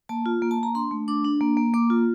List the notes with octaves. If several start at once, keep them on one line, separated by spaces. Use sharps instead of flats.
A#3 A5
F4
A#3
A5
A#3 A#5
D4 C6
A3
D4 D6
D4
A#3
A#3
A#3 D6
F4